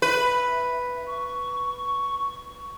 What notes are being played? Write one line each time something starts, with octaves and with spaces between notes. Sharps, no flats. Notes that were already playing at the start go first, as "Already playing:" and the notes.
B4 E5
C#6